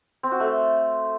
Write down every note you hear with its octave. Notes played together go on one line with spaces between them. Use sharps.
C4
F#4
A3